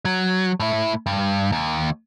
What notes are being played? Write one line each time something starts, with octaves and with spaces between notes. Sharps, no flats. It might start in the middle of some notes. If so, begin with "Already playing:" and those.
F#3
A2 E4
G2
D#2